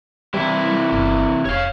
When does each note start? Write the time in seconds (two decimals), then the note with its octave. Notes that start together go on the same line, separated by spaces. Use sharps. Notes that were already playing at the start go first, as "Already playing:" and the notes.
0.34 C3 E3 G3 E4
0.92 G1
1.45 F1 C#5 F5